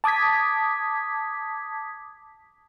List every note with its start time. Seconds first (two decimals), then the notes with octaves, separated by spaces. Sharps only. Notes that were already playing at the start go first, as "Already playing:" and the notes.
0.04 A5 D6 D#6 G#6 B6